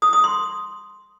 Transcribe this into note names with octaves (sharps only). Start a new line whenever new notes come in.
D#6
D#6
C6